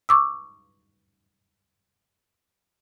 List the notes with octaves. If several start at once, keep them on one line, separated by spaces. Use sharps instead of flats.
C#6 D6 E6